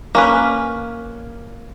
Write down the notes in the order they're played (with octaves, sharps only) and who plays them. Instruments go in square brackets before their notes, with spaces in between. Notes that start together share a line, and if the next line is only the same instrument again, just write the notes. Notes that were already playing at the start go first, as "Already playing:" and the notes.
[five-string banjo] A#3 C#4 B4